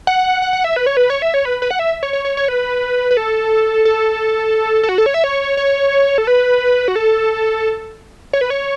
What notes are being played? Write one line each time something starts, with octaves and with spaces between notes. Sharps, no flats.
F#5
F#5
F#5
E5
B4
C#5
B4
C#5
E5
C#5
B4
B4
F#5
E5
C#5
C#5
C#5
C#5
B4
B4
A4
A4
A4
F#4
A4
C#5
E5
C#5
C#5
A4
B4
F#4
A4
C#5
B4
C#5